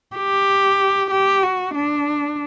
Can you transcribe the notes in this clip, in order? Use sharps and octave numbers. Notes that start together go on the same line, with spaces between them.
G4
G4
F#4
D4